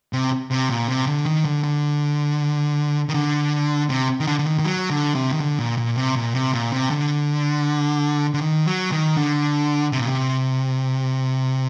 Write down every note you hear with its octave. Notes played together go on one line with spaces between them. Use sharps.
C3
C3
A#2
C3
D3
D#3
D3
D3
D#3
D3
C3
D#3
D3
D3
D#3
D#3
F#3
D3
C3
D#3
D3
A#2
A#2
C3
A#2
C3
A#2
C3
D3
D3
D#3
F#3
D#3
D3
C3
A#2
C3